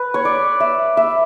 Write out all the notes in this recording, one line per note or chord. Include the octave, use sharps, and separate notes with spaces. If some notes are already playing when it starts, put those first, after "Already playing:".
Already playing: B4
C#5
D5
E5
E5